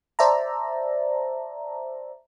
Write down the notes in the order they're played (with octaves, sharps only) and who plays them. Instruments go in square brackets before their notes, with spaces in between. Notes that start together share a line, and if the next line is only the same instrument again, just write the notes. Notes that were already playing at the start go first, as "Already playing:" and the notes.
[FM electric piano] C5 D5 E5 A5 A#5